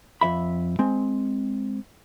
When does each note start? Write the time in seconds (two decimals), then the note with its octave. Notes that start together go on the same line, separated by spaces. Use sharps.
0.21 F2 E5 B5
0.79 G#3 C4